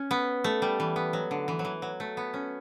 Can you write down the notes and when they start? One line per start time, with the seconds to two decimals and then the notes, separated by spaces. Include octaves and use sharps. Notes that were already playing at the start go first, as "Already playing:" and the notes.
Already playing: C#4
0.11 B3
0.44 A3
0.62 G3
0.80 E3
0.96 B3
1.13 F#3
1.31 D3
1.48 E3
1.59 F#3
1.65 E3
1.82 F#3
2.00 A3
2.17 B3
2.34 C#4